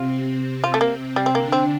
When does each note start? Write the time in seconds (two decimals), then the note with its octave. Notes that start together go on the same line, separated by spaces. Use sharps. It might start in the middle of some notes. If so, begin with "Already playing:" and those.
Already playing: C3 C4 F4
0.64 F4
0.74 A3
0.81 A#3
1.16 G3
1.26 C4
1.35 D3 A#3 D4
1.52 C4